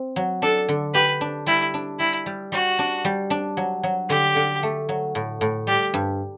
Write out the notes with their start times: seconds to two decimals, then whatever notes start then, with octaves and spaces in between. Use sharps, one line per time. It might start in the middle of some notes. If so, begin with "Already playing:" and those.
Already playing: C4
0.16 F#3
0.42 D4 A4
0.69 D3
0.94 G4 B4
1.21 D4
1.46 G3 E4
1.74 D4
1.99 G3 E4
2.26 G3
2.52 G3 F#4
2.79 D4
3.05 G3
3.30 D4
3.57 F#3
3.83 F#3
4.09 D3 G4
4.36 D3
4.63 A3
4.89 F#3
5.15 A2
5.41 A2
5.67 G3 G4
5.94 G2